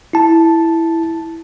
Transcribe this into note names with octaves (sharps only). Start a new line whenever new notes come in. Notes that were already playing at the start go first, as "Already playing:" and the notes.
E4 A5